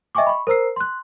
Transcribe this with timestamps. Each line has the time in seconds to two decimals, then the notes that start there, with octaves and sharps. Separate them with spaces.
0.15 D#5 E5 G5 G#5 C#6 D6
0.26 B5 C#6
0.47 A#4 C5 A#5 E6 C7
0.76 C6 F#6